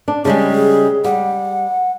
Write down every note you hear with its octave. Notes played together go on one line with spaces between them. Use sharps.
D4
C#3 G3 G#3 G#4
G3 F#5